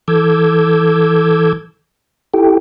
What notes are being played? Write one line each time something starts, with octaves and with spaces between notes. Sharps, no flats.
E3 A4 D6 E6 G6 G#6
E4 G4 A4 G5